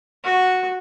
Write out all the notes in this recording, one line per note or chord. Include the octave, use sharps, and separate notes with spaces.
F#4